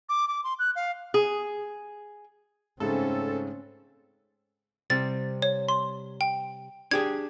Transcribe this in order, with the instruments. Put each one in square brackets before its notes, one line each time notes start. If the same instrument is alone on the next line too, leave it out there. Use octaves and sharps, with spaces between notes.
[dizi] D6
D6
C6
F#6
F5
[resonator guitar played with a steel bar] G#4
[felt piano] G#2 C#3 A3 [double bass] C4 C#4 [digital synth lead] A4
[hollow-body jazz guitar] C3 G3 C4 [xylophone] A6
[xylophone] C#5
C6
G5
[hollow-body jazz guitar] D4 G4 G#4 [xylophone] G#6